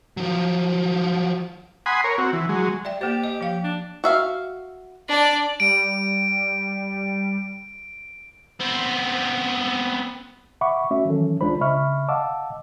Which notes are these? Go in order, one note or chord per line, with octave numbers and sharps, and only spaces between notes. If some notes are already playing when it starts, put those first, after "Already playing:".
F3 F#3
F#5 G#5 B5 C6 D#6
A#4 C#5
C4 F#4
E3
F#3 G#3
D5 E5 G5
A#3 G4 C5
D#5
F3 F5
D4
F#4 E5 F5
D4 D5
G3 D7
B3 C4
E5 F#5 B5 C#6 D6
A3 C#4 F#4 E5
D#3 E3 F#3 C#4 A4
C2 G#3 D4 F4 C5 B5
C#3 D#5 E5 B5 C#6 F6
D#5 F5 F#5 A5 D6 E6